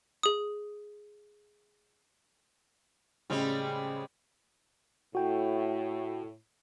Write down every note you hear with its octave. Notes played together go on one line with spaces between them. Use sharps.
G#4 D#6
A1 C#3 G3 G#3 C4
A2 F#4 G5